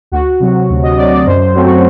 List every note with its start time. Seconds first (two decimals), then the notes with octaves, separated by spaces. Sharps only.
0.12 D2 F#4
0.40 C3 F#3
0.70 D2
0.83 D#5
0.97 C3 F#3 D5
1.12 D5
1.26 F#2 C5
1.55 F#3 A3 C4
1.65 F#4